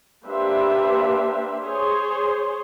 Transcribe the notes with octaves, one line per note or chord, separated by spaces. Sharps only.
A#3 D4 G4 B4 C5 E5
G#4 C5 C#5